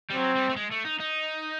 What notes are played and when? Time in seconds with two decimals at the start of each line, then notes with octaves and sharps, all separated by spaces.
0.10 G3
0.14 F#3 C4
0.35 G3
0.49 A3
0.56 G#3
0.72 A3
0.85 D#4
1.00 D#4